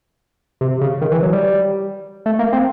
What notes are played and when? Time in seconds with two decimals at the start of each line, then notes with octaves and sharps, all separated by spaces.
0.61 C3
0.81 C#3
1.01 D#3
1.12 E3
1.23 F#3
1.33 G3
2.26 A3
2.39 A#3
2.53 C4